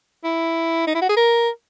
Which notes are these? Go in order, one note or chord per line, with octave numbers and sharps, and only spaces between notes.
E4
D#4
E4
F#4
G#4
A#4